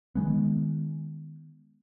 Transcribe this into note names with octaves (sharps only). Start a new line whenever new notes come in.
D#3 F#3 G#3 B3